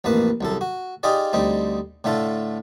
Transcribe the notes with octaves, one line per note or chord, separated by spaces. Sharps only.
A1 F2 A#3 B4
C2 F#2 A4
F#4
D#4 F4 G4 G#4 D5
D2 G3 C4 D#4
A2 D3 A3 F4 A4